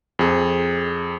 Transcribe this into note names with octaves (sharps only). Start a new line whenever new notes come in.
F2 G#4